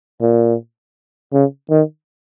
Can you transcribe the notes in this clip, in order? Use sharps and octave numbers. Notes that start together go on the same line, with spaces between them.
A#2
C#3
D#3